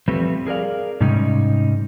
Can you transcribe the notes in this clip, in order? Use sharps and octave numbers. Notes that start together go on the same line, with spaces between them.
F3 G3 A3 C4 B4
G#4 A#4 D5 F5
G#2 C3 G3 C#4 D#4